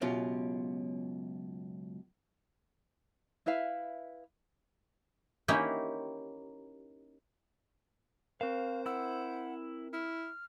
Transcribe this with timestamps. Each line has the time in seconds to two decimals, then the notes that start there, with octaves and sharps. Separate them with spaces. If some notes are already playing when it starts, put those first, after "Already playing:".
0.01 C#2 F#2 B2 C#4 F4 G4
3.46 E4 B4 E5 F5
5.48 A#3 C#4 D#4 E4 G4
8.41 C4 A#4 C5 F5
8.86 E4 F#5 E6
9.93 E4 F6